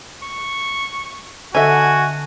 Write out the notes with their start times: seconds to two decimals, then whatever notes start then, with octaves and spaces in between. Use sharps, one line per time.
0.22 C#6
1.55 D3 F#4 D#5 E5 G#5